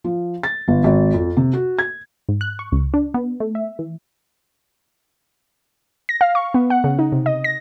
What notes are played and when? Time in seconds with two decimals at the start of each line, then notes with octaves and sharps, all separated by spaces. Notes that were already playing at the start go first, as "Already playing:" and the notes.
0.04 F3
0.43 A6
0.68 G1
0.84 G#1
1.13 F2
1.37 C3
1.53 F#4
1.79 G#6
2.29 G#2
2.41 F#6
2.59 C#6
2.72 C#2
2.94 D4
3.14 B3
3.40 A3
3.55 E5
3.79 E3
6.09 A#6
6.21 F5
6.35 C#6
6.54 B3
6.70 F#5
6.84 C#3
6.99 D#4
7.12 C3
7.26 D#5
7.44 A#6